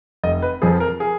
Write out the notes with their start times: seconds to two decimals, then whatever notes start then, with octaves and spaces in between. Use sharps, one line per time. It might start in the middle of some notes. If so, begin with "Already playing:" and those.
0.24 F1 D#5
0.42 B4
0.62 F2 F3 G#4
0.80 A#4
1.00 G#4